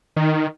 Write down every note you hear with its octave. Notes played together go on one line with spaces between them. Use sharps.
D#3